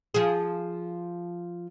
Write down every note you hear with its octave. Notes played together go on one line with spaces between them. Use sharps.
F3 G#4